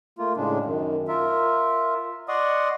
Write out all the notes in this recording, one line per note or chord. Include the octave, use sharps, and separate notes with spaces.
A3 A#3 F4
A2 C#3 G#3 D4
F#2 D#3
F4 A#4 E5
D5 D#5 F#5 C6 C#6 D#6